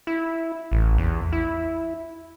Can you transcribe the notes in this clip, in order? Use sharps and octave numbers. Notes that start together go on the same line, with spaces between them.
E4
A1
E2
E4